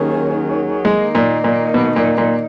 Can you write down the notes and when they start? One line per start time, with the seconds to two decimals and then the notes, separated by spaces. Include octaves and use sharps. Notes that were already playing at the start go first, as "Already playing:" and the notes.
Already playing: D#2 D#3 F#3 C#4 G#4
0.85 D#3 G#3 A#3 D#4
1.15 A#2
1.44 A#2
1.74 B2
1.96 A#2
2.18 A#2